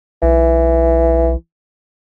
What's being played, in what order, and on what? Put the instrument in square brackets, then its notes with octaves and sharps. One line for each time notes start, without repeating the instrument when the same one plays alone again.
[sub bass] B1 [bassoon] E3